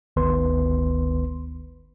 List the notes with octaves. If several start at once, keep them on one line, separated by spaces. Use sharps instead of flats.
G1 D2 D#3 B3 B4 C6